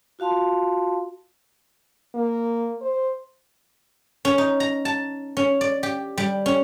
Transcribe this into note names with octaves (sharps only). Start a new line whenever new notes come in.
F4 F#4 F5 A5 C6
A#3
C5
C#4
D#4
A#5
A5
C#4
D5
G4
G3
C#4